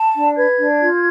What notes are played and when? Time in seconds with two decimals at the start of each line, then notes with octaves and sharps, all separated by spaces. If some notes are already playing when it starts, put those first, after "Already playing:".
Already playing: A5
0.15 D4
0.36 B4 G#6
0.57 D4
0.80 F4